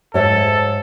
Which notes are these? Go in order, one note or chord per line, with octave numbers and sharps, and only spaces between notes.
G#2 A4 C#5 E5